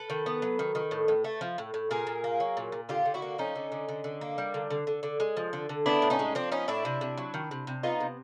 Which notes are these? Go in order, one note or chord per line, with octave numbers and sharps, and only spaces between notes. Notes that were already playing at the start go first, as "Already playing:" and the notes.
Already playing: A4 B4
D#3
B3
F#3
D#3
D#3
A2
A2
A3
F3
A2
A2
A#2 G#4 A#4
A#2
A#3
F#3
A#2
A#2
D3 F4 G4
D3
E4 F#4
A#3
F3 C#4 D#4
D3
D3
D3
D3
A#3
G3
D3
D3
D3
D3
G#3
F3
D3
D3
B3 D4 E4
A2
C#4 D#4
G#3
F3 C4 D4
B3 C#4 D#4
A2 D4 E4
C3
C3
F#3
D#3
C3
C3
B3 D#4 F4
C3